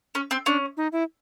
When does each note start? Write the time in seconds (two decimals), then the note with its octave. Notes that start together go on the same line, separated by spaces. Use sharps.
0.15 C#4
0.31 C4
0.46 C#4 D4
0.77 D#4
0.92 E4